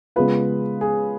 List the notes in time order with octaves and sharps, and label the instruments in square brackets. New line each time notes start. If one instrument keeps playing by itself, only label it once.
[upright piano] C#3 G#3 B3 F4 [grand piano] B4
[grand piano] G#4